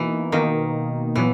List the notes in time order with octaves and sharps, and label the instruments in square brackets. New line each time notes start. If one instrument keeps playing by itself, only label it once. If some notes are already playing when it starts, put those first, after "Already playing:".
Already playing: [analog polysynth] B2 A#3 D#4 [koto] E3
[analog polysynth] B2 A#3 D#4 [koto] D#3
[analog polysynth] A#2 F#3 B3 [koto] E3